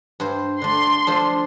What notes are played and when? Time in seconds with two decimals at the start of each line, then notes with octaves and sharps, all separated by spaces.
0.20 G2 C5
0.62 D3 A3 C6
1.07 F3 D4 A4